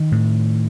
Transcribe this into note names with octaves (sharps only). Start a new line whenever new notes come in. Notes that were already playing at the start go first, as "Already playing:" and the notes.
Already playing: D#3
A2